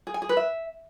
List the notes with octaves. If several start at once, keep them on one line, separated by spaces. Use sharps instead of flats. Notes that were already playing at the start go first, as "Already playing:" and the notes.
G#4
G#5
G#4
B4
E5